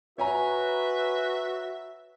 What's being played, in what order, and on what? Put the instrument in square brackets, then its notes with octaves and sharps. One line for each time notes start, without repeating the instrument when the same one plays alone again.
[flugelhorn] F#4 [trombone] B4 [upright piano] C#5 G#5 A#5 [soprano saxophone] E5